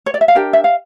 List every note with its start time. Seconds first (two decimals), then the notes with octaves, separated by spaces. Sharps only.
0.06 C#5
0.14 D5
0.21 E5
0.28 F5
0.35 D4 G4 A#4 G5
0.53 E5
0.64 F5